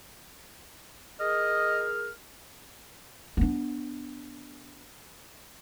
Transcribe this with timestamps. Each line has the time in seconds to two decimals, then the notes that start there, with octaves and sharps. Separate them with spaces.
1.20 G#4 A#4 D#5 F6
3.37 B3 D4